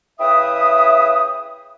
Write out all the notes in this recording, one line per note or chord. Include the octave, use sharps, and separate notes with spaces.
C#3 E4 B4 E5 G5 D#6